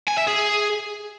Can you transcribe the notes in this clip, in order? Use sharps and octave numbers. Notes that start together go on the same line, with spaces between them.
G#5
E5
G#4